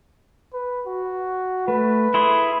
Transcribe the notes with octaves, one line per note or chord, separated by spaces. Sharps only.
B4
F#4
A3 B4
E4 G#4 C6